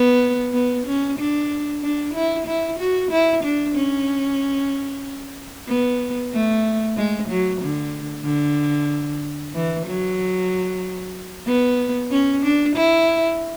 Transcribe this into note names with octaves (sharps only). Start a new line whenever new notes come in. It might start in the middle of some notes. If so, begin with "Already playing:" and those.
Already playing: B3
B3
C#4
D4
D4
E4
E4
F#4
E4
D4
C#4
B3
A3
G#3
F#3
D3
D3
E3
F#3
B3
C#4
D4
E4